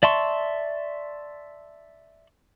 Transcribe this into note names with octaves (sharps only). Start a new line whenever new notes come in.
D5 E5 A5 C6 C#6